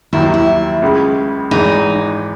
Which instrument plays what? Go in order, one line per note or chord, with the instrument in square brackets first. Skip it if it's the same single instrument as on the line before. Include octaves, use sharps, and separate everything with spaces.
[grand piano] D#2 D#3 F#3 [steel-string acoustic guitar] E4
[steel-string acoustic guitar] E4
[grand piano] C#2 C#3 G#3
[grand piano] G#1 G#2 E3 G#3 [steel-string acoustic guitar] D#4